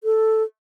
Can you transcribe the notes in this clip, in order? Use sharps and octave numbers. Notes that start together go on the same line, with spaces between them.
A4